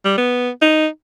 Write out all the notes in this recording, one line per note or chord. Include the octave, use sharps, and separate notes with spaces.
G3
B3
D#4